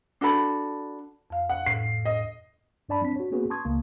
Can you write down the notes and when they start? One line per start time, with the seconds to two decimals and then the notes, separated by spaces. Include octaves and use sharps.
0.21 D4 F#4 A4 B5
1.30 F2 F5
1.49 F#5
1.66 A2 C7
2.05 D#5
2.89 G2 D4 D5 A5 B5
3.01 F#3 C4 D4 B6
3.16 F#4 C#5
3.32 A#3 B3 C#4 F#4 G#4 B4
3.50 A5 C6 C#6 D#6 G#6
3.65 C#2 C#3 A#3